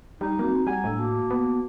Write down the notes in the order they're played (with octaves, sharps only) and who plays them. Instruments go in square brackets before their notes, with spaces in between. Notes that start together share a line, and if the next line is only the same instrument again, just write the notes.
[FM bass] G3 [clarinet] D#4
[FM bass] A#3 [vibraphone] C4 F#4
[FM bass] G3 [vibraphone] F#5 A#5 [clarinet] G#5
[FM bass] A2 [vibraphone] D4 E6
[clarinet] A#3 [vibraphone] F#4 A5
[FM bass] B3